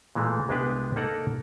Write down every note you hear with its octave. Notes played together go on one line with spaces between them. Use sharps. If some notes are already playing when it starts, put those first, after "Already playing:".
A#2 E3 G#3 A3
C2 G#3 B3 D4 G4 B4
A#3 D#4 A4 D5 F#5 A#5